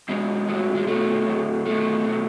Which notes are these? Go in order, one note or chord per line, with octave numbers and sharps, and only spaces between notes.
B2 F#3 G#3
A2 F#3
G#3
B2 F#3 A3
A2 F#3
B2 F#3 A3
B2 F#3